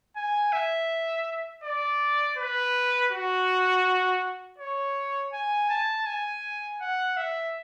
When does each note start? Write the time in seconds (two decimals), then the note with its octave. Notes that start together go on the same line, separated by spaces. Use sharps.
0.16 G#5
0.52 E5
1.63 D5
2.37 B4
3.12 F#4
4.58 C#5
5.33 G#5
5.70 A5
6.06 G#5
6.81 F#5
7.17 E5